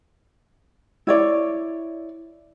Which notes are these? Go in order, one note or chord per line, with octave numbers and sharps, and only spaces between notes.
E4 C#5 D5